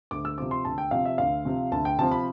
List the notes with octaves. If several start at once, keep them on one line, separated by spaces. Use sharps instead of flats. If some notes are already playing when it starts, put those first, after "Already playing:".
D2 D6
E6
C3 F3 C4 D6
C6
D2 A5
G5
C3 F3 C4 F5
E5
D2 F5
C3 F3 C4
D2 A5
G5
C3 F3 C4 A5
B5